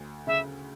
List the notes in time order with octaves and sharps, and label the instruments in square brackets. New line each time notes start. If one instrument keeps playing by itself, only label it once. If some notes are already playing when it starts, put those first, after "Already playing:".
Already playing: [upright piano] D2
[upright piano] C#3 [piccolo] E5